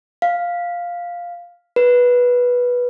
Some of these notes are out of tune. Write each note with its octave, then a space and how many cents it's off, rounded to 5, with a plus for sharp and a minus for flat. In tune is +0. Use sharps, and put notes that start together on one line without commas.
F5 +5
B4 -10